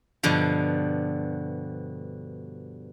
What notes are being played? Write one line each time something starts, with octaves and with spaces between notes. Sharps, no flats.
G2 B2 D3 F3